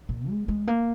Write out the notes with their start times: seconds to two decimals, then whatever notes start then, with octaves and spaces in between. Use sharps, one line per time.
0.09 A#2
0.29 G#3
0.48 G#3
0.67 A#3